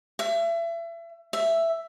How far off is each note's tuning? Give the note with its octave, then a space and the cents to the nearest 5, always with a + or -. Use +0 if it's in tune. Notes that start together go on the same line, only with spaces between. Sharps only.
E5 +30
E5 +5